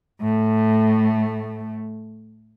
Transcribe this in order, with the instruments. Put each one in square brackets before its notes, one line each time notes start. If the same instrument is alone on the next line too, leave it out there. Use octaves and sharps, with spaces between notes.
[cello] A2 A3